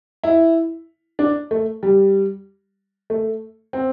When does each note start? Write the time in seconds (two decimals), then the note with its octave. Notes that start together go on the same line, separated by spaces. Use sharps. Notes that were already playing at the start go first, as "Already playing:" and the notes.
0.23 E4
1.19 D4
1.51 A3
1.83 G3
3.10 A3
3.73 C4